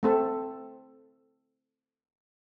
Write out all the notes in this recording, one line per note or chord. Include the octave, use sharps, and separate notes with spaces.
A3 C4 A4